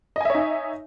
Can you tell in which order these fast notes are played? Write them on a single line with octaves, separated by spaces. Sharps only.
D#5 G#5 E5 C#5 D#4